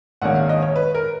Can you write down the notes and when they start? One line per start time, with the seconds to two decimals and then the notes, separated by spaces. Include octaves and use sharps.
0.22 A#1 G#2 D#3 A#3 C#4 F#5
0.35 F5
0.49 D#5
0.62 C#5
0.76 B4
0.95 A#4